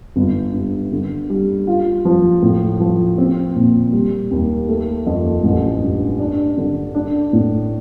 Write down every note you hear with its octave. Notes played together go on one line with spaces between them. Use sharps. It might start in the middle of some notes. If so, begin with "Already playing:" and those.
G1
G2
D3
G3
F4
F3
A2
F3
C4
A#2
G3
D#2
A3
F2
A1
G2
D4
D3
D4
A2